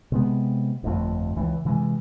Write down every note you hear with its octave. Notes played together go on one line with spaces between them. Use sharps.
C3 G#3 B3
G1 F2 A3
C#2 E3
C3 E3 F3 G#3